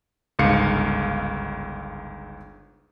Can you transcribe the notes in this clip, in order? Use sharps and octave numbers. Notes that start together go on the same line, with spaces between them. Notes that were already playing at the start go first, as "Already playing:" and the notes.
G1 C#2 G#2 F5 C#7